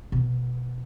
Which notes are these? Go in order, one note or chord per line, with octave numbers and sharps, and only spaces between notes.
B2